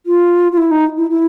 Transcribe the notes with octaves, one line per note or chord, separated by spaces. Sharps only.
F4
F4
E4
D#4
E4
E4